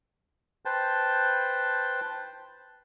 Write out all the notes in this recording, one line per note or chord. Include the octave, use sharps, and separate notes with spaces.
B4 C5 G5 A5